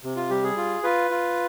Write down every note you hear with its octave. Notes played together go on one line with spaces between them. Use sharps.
C3
F4
G3 G4
G#4
F4
F4 B4
F4